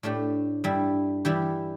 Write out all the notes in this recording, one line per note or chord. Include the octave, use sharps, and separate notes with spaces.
A2 A3 D4 G4
G2 G3 E4
E3 G3 E4 G4